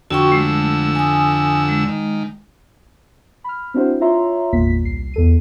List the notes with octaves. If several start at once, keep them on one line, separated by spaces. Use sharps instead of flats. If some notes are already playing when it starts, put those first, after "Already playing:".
F2 D3 F#4 G5 C#6 E6
G#3 A3
G#5 D#6
G#3
D#3
B5 F6
C4 D4 E4 F#4 C5
F4 C#5 E5 A#5 C6
G#1 E2 A#2 A#3 B6
C2 C7
E2 A4 D#7